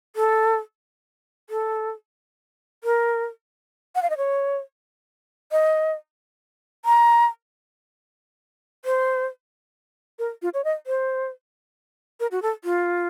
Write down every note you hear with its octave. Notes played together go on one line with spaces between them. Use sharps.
A4
A4
A#4
F#5
F5
D#5
C#5
D#5
A#5
C5
A#4
F4
C#5
D#5
C5
A#4
F#4
A4
F4